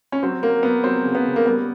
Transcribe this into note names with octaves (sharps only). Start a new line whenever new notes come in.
C#4
F#3 C4
F#3 A#3
F#3 B3
F#3 C4
C#3
B3
C#3
A#3
G3 B3